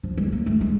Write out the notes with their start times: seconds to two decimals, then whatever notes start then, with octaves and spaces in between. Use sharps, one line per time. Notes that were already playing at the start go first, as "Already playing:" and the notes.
0.03 F3
0.17 G#3
0.32 A#3
0.46 A3
0.61 G#3